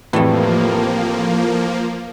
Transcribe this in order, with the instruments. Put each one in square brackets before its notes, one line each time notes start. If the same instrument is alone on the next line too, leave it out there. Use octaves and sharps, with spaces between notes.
[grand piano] F2 A2 [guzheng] E3 G3 A3 [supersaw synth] F3 A#3